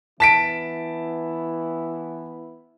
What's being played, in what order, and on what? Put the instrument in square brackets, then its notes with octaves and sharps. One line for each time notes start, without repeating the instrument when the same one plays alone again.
[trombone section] E3 B3 E4 [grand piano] A5 B6 D7